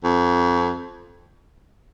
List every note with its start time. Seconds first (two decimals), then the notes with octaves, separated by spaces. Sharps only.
0.05 F2